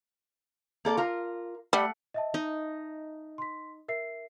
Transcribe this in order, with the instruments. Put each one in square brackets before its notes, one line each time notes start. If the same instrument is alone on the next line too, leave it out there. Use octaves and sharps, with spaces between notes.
[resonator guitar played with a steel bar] A#3 A4 D5
F4 A#4
[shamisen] G3 [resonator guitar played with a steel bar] A3 F#5
[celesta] D#5 E5 A5
[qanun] D#4
[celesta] C6 B6
A#4 E5 C7